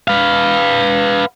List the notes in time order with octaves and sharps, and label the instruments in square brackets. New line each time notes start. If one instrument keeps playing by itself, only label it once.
[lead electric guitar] B4 F5